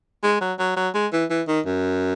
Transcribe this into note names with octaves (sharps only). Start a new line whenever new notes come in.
G#3
F#3
F#3
F#3
G#3
E3
E3
D#3
F#2